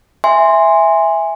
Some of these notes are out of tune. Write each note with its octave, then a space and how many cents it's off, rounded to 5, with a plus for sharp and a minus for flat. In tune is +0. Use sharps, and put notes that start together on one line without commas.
E5 +0 G#5 -15 C6 +0